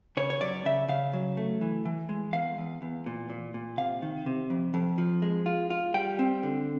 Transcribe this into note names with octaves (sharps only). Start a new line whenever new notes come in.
C#3 C#5
C#5
F#2 D5
C#3 E5
C#3 F5
F#3
A3
E3
E3
G#3
E2 F5
E2
E2
A#2
A#2
A#2
C3 F5
D#3
C3
F2
F2
F3
G#3
F4
F4
G3 G5
C4
D3